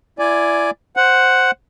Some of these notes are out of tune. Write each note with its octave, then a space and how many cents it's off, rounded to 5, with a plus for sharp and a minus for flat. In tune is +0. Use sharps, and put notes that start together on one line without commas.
E4 +30 D5 +0 G#5 +0
C5 +0 F#5 +0